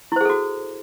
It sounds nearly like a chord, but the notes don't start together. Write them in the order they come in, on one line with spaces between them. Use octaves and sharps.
E4 C5 G#4 A4 F#4